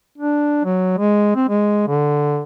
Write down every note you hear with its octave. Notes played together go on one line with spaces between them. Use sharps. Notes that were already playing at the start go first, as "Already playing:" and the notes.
D4
F#3
G#3
C4
G#3
D3